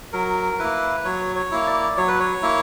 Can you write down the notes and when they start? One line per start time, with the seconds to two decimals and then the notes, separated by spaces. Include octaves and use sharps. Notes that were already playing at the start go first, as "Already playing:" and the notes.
0.13 F#3 A#4
0.59 A#3 E4 B4
1.05 F#3 C#5
1.36 C#5
1.52 A#3 E4
1.67 D5
1.97 F#3 C#5
2.08 B4
2.20 C#5
2.42 A#3 E4